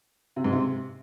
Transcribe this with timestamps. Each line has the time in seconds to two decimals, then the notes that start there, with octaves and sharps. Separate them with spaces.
0.36 C3
0.44 G#2
0.52 C3